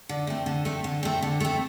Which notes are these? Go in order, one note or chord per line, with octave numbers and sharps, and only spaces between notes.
D3
A3 C4
D3
A3 C4
D3
A3 C4
D3
A3 C4